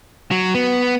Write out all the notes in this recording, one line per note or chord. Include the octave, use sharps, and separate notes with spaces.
F#3
B3